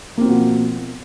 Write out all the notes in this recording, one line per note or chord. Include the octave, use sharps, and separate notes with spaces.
B2 F3 A#3 C4